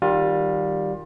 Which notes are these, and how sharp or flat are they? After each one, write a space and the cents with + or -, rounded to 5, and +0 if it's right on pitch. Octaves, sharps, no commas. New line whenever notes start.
D#3 +0 G3 -5 F4 +25